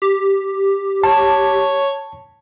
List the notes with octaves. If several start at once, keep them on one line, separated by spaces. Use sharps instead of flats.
G4
C#5 A5